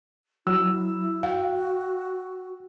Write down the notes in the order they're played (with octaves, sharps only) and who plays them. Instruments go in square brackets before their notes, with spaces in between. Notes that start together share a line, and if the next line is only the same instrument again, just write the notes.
[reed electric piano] F#3 [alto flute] E4 [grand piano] E6
[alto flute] F#4 [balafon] F5 [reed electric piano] G5